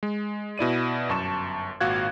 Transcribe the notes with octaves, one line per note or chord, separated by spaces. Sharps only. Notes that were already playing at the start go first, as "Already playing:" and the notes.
G#3
B2 E4 D5 D#7
G1 F#2 A5 C#6 E7
G#1 A#2 F#4 F5 F#6 G#6